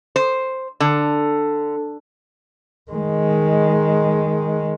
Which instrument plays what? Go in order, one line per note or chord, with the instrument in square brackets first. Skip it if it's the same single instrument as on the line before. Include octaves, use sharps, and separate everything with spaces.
[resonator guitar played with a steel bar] C5
D3
[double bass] D#3 G#3